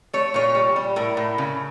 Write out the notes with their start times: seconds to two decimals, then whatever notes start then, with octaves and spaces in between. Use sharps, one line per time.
0.13 A3 C#5
0.34 A#2 C#5
0.55 G3
0.76 G3
0.96 A2 A#4
1.17 A2
1.38 C#3